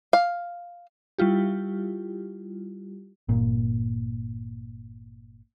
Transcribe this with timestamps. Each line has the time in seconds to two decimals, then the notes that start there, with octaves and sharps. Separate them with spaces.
0.13 F5
1.18 G3 E4 F4 G4
3.28 G1 A#2